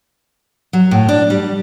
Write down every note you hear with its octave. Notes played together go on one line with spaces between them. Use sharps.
F#3
A2
D4
G3